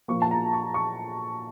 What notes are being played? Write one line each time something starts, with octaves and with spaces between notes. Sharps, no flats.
A#2 F3 A#3 C#6
A5
A#5
C#6
C#6